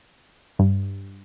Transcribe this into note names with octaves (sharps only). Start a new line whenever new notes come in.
G2